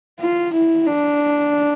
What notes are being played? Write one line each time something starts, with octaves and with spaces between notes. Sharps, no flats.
F4
E4
D4